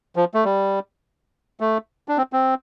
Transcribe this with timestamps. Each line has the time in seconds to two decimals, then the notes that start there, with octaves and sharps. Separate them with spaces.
0.16 F3
0.34 A3
0.45 G3
1.60 A3
2.08 D4
2.18 C4
2.33 C4